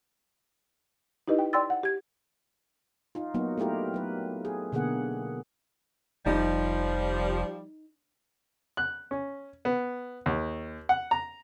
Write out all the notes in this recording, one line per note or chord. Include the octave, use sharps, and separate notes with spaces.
D#4 E4 G4 B4 D#5
G5
D5 G5 C6 E6 A6
F#5
G4 G#6
D#4 F4
F#3 A#3 B3 D#4 F#4
A3 E4 F4 G4 A#4
F#3 B4
G#4
B2 D3 A#3 G#4 F#5
F1 F3 G3 D#4
F#6
C#4
B3
D#2
F#5
A#5